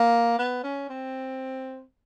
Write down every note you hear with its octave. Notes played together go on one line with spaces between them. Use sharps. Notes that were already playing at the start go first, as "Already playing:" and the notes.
Already playing: A#3
B3
C#4
C4